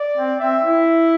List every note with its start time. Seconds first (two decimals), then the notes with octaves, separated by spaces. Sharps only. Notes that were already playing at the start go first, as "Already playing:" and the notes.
Already playing: D5
0.17 C4
0.40 C4 E5
0.64 E4